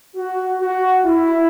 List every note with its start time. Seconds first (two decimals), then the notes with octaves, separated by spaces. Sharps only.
0.16 F#4
0.60 F#4
1.05 E4